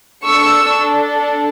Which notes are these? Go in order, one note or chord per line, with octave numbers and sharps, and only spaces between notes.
D4 A4 C#6 E6